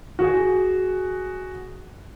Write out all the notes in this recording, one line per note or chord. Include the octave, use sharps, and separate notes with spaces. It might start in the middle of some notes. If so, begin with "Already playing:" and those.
F#4 G#4